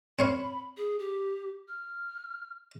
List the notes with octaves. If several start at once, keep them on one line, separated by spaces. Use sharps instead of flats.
C4 C#5 F5 B5
G#4
G4
F6